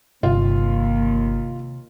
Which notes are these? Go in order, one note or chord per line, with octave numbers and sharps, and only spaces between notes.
G1 D#2 C3 F4